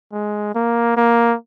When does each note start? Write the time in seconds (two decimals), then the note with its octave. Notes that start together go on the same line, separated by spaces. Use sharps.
0.13 G#3
0.55 A#3
0.97 A#3